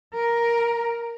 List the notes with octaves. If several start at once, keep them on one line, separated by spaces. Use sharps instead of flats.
A#4